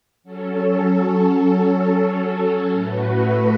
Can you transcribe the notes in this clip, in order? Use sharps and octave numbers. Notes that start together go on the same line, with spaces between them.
F#3 C#4 A4
A2 A3 F#4 B4